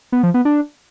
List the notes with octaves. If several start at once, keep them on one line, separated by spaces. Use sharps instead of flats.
B3
F3
B3
D4